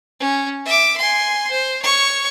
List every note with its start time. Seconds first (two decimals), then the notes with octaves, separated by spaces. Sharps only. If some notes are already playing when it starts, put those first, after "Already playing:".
0.20 C#4
0.65 E5 D6
0.97 G#5 C6
1.51 C5
1.82 C#5 C#6